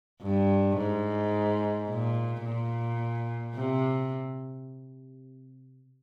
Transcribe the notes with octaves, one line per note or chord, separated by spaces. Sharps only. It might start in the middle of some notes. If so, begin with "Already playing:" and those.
G2
G#2
A#2
A#2
C3